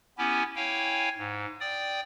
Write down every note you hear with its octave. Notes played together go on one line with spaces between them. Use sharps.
B3 C#4 E4 G4 G#5
E4 C#5 F5 G5 G#5
G#2
D5 G5 D#6